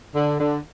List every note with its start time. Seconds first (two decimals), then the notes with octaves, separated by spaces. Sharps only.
0.15 D3
0.39 D3